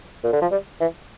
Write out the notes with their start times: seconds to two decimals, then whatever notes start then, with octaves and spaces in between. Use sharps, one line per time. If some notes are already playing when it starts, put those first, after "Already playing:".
0.24 A#2
0.33 D3
0.42 F3
0.51 G3
0.81 E3